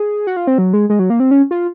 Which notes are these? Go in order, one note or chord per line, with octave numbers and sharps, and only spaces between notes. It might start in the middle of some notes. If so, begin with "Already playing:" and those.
Already playing: G#4
F#4
F4
C4
F#3
G#3
G#3
F#3
A#3
C4
C#4
F4